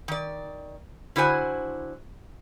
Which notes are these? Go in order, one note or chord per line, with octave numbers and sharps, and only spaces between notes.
D#3 D5
D3 E4 F#4 C5 G#5